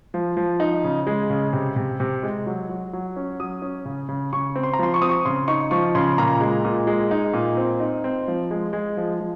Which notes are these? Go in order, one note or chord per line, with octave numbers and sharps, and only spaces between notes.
F3
F3
D#4
C#3
G#3
C#3
C3
C3
C3
G#3
F#3
F#3
F#3
C#4
F#3 D#6
C#4
C#3
C#3
C#3 C#6
C4
C6
A#5
F3 C6
C#6
C4 D#6
C#6
C#3 C6
D#4 C#6
F3 C#6
C#3 C6
A#2 A#5
G#3
A#2
G#3
D#4
A#2
C4
D#4
C4
F3
G#3
G#3
F3
F3